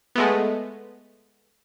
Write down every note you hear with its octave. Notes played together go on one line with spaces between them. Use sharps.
G#3 A3 B3